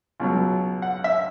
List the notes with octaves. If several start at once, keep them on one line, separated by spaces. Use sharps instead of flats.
C#2 B2 F#3
F#5
E5